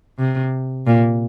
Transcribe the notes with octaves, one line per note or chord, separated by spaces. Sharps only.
C3
A#2